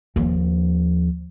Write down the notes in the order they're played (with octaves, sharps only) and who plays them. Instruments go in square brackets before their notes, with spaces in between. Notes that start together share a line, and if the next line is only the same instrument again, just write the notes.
[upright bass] D#2 F3